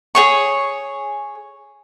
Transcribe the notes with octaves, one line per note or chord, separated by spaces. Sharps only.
G#4 C#5 C#6